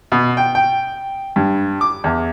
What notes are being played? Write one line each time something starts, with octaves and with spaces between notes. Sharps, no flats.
B2
G5
G5
G2
D6
E2